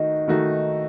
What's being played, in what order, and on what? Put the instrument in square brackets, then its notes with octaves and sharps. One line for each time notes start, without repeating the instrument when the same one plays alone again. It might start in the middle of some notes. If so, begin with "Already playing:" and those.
Already playing: [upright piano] D#3 A3 D#4 F#4 [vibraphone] D#5
[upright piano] D#3 A3 D#4 F#4